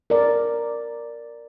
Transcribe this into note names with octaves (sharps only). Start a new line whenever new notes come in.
A#4 D5